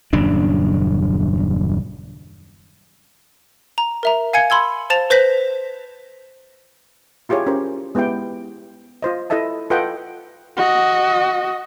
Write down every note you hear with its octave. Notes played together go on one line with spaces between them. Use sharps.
D#1 F#2 C#3 D4
A#5
A#4 E5 A#5
F5 G#5 G#6 C#7
B5 C6 E6 G#6
C5 F5 A5 A6 E7 F7
B4 C5 G6 A#6 B6
E4 F4 G4 G#4 C#5
C#4 G4 A#4 C5
G#3 B3 E4 G4 G5
F4 C5 D#5
E4 A4 D#5 E5 A5
F4 A4 B4 D#5 F#5 G5
F#4 D#5